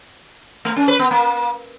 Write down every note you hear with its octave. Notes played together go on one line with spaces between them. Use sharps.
A3
C#4
B4
B3
A#3